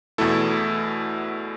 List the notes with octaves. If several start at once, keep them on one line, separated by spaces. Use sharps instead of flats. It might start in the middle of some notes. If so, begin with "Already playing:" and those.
E2 B2 A3 E4 A4